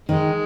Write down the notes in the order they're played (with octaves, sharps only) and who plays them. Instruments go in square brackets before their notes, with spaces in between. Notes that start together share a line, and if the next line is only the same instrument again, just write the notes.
[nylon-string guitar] D#3 [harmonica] G#3